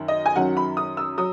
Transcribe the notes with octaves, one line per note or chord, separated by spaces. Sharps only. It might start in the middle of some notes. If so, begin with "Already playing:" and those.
Already playing: F#2 D#3
D#5
G#5
F#2 D#3 F#3 F#5
B5
D#6
E6
F#3 D#6